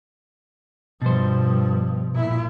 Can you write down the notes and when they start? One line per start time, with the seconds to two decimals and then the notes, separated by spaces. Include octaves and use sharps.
1.02 G2 B2 F3 C5
2.14 A#2 E4